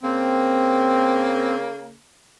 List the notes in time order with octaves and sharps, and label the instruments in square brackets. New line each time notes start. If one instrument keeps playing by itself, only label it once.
[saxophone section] C#3 A#3 [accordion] C4